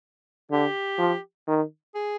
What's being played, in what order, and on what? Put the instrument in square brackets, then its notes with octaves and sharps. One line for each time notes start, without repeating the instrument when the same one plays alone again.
[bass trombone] D3 [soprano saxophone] G4
[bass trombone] F3
D#3
[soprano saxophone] G#4